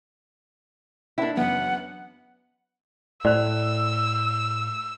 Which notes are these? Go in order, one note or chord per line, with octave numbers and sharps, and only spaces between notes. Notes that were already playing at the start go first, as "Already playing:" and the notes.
A#3 D4 E4 F#5 E7
F#2 C#3 E3 B3 F#5
A2 C5 D5 E6